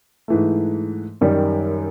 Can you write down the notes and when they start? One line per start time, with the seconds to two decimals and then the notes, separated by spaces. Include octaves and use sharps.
0.28 G#2 E3 A3
1.21 F#2 D#3 G3